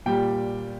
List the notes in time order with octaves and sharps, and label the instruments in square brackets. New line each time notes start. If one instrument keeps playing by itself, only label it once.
[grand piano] A#2 G3 G5